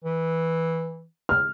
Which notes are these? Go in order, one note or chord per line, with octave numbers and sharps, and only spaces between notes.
E3
F6